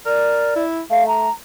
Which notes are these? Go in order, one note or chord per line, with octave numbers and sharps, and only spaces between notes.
A#4 D5
E4
A3 F5
A#5